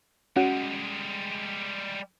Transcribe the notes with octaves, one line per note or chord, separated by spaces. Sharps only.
G3 G#3 C#4 F#4 F#5